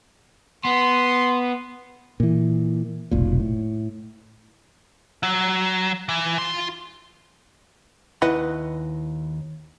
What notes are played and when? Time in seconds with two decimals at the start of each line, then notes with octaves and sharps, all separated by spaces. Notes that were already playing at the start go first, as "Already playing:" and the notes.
0.65 B3 C6
2.20 A#2 E3
3.11 F1 B1 A#2
3.40 A2
5.23 F#3
6.09 E3
6.38 F4 C6
8.22 D#2 E4 B4 D#5 F#5 B5